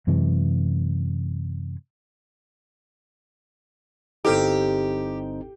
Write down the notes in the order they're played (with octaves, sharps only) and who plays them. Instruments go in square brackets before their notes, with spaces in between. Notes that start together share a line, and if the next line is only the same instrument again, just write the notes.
[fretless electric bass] F#2 C3 E3 G#3
[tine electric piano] G1 C4 D#4 [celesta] E4 A4 F6 [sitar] G4